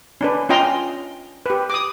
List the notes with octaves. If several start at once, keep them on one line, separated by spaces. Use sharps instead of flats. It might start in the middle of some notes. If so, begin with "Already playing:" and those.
C#4 D4 B4
C#4 F4 D#5 G5 A#5 C6
G4 B4
D6 D#6